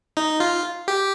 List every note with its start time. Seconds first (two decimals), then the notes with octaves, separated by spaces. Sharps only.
0.17 D#4
0.40 F4
0.88 G4